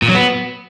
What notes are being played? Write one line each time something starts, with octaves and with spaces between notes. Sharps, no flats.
A#2
F#3
B3